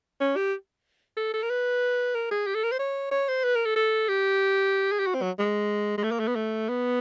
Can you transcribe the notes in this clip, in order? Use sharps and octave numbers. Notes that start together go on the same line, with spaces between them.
C#4
G4
A4
A4
A#4
B4
A#4
G#4
G4
A4
A#4
C5
C#5
C#5
C5
B4
A#4
A4
A4
G4
G#4
G4
F#4
C4
F#3
G#3
G#3
A3
A#3
A3
B3
A3
B3